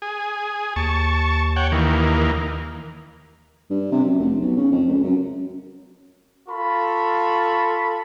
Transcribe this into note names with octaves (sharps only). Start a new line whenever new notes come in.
G#4
D#2 A5 C#6
C#5 F#5 G5
D#3 E3 A#3
G2
C3
F#2
F1
B1
C#3
F2
C#2
F#2
F4 A4 B5 C#6